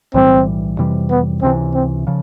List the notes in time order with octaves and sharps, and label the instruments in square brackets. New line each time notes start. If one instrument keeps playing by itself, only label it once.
[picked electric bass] B1 A2 E3 G3 [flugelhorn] C4
[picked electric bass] F2 C3 E3 G3
[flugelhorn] B3
[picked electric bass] C#2 C3 E3 [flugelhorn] C4
[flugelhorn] C4
[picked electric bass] C#3 F3